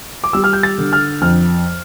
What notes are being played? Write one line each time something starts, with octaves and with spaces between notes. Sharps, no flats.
D6
G3 E6
F6
G6
A6
D3
F6
F2 F6